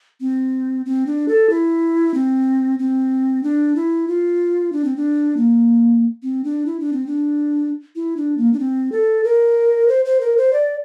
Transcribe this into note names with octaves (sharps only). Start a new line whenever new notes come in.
C4
C4
D4
A4
E4
C4
C4
D4
E4
F4
D4
C4
D4
A#3
C4
D4
E4
D4
C4
D4
E4
D4
A#3
D4
C4
A4
A#4
C5
C5
A#4
C5
D5